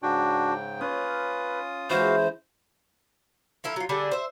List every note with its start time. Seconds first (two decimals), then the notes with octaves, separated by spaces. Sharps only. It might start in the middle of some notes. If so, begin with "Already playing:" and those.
0.03 G#2 C#3 D4 F#4 G5
0.81 C#4 F4 B4 D#6
1.90 E3 G#3 F#4 C5 F5
3.64 F3 E4 A4 A#4
3.76 F#3 F4
3.89 D3 G3 D4 G#4
4.11 C5 E5